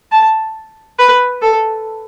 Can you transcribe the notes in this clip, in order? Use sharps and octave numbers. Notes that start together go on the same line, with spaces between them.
A5
B4
A4